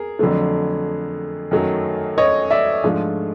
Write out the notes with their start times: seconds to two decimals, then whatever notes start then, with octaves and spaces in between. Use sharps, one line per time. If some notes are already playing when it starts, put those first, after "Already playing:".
Already playing: G#4 A#4
0.19 F2 D3 F#3 A3
1.51 F#2 D#3 F#3 A3
2.18 C#5 D#5
2.50 D5 E5
2.84 G#2 F3 A3 D4 F4